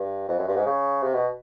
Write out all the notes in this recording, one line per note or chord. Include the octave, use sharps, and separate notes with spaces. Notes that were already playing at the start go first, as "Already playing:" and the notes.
Already playing: G2
F2
F#2
G2
G#2
C#3
C3
B2